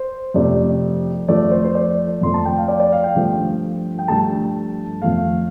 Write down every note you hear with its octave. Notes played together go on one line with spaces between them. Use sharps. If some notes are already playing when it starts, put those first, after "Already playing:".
Already playing: C5
F2 C3 F3 A3 D5
F2 F3 A3 D5
C5
C5
D5
F2 F3 A3 C6
A5
G5
F5
D5
D5
F5
G5
G2 F3 A3
G5
G2 F3 A3 A5
F2 F3 A3 F5